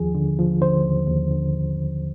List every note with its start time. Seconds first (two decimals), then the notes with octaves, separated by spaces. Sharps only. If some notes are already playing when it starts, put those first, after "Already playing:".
Already playing: D#2 F3 G#4
0.15 D3
0.39 F3
0.61 D3 C5
0.84 D#2
1.07 D#2
1.30 D3